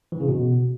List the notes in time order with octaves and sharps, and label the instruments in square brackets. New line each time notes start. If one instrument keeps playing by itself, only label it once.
[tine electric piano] E3
C#3
B2